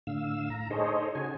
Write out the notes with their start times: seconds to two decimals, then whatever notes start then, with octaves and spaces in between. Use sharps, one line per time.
0.07 A2 D3 F5 E6
0.50 A2 A#5
0.70 D#4 G#4 A4 C5 C#5 D#5
1.15 C#3 F#4 G#5